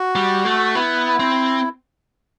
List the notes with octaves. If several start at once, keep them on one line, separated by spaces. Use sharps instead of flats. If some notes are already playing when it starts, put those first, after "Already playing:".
Already playing: F#4
G3
A3
B3 E4
C4